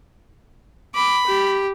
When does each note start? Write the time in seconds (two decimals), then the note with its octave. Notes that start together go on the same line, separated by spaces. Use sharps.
0.95 B5 D6
1.27 G4